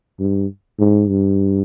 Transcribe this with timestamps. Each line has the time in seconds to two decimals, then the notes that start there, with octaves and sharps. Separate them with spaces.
0.20 G2
0.79 G#2
1.09 G2